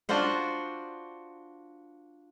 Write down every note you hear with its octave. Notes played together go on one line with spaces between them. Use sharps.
D4 F4 F#4 C5